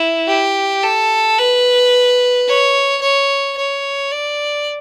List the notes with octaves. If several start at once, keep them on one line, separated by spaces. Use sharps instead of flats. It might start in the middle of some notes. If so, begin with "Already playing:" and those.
Already playing: E4
G4
A4
B4
C#5
C#5
C#5
D5